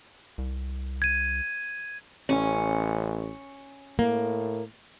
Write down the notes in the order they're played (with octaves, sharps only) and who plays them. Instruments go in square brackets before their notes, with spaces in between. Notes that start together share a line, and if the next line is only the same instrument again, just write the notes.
[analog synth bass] C2
[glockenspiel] G#6 D#7
[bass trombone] A1 [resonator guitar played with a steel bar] C#4
[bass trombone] A2 [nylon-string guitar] A#3